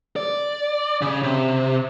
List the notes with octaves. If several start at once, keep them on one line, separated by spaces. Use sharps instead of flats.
D5
C#3
C3